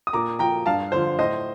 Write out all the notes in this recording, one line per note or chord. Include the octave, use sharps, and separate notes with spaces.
D#6
A#2 A#5 D6
F3 G5 A#5
G2 F5 A5
D3 F3 C5
A2 C5 D#5